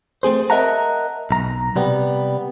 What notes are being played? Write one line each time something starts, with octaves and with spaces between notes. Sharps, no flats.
A3 C4 G#4 C5
A#4 D#5 E5 F#5 A5 A#5
B1 A#5
C3 G3 B3